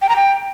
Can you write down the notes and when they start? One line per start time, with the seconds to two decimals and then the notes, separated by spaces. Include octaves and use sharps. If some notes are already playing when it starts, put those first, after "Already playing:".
0.02 G5
0.09 A#5
0.16 G5